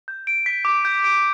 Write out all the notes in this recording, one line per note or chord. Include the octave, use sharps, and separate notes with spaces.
G6
D7
B6
D6
G6
D7